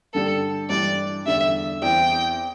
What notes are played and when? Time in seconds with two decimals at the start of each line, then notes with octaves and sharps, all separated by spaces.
0.14 G2 D3 G3 A4
0.70 G2 E3 G3 D4 D5
1.26 E2 D3 G3 E5
1.82 E2 E3 C4 E4 G5